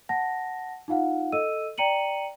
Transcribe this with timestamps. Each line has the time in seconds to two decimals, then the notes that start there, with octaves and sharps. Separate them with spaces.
0.09 F#5 A5 A#6
0.88 D#4 F4 F5 F#5
1.32 A4 D#5 E6 D#7
1.78 D5 G5 A#5 C#7 D#7 F#7